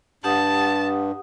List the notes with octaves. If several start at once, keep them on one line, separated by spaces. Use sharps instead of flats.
G2 G4 F#5 A5 D#6